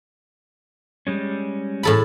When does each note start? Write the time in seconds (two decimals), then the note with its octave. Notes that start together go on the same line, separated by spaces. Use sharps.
1.07 G3 G#3 C#4
1.83 A2 A4 B5